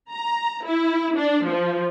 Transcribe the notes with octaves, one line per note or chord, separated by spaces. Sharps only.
A#5
E4
D4
F3